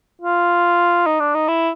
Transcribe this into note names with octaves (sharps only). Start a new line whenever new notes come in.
F4
D#4
D4
D#4
E4